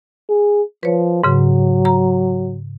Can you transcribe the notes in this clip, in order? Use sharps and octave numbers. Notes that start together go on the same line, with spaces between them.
G#4
F3 B4 C#5
G#2 C#3 F#3
A#5